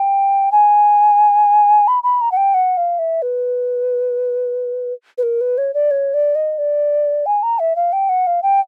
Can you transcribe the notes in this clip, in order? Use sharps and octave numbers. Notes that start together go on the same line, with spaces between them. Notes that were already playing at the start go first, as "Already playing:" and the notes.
Already playing: G5
G#5
B5
B5
A#5
F#5
G5
F#5
F5
E5
B4
B4
A#4
B4
C#5
D5
C#5
D5
D#5
D5
G#5
A#5
E5
F5
G5
F#5
F5
G5